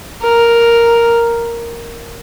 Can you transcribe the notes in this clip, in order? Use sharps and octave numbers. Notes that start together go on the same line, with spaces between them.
A#4